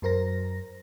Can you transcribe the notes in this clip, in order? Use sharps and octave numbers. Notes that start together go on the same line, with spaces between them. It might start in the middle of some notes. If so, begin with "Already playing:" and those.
F#2 F#3 A#4 C5 A#6